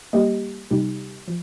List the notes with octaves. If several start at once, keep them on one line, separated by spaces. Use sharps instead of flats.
G3 A#3 G4 D#5
C3 G3 D#4 G4
F3